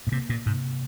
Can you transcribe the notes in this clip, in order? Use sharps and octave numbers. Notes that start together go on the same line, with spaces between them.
A#2
C3 A#3
A#2
G#2 C3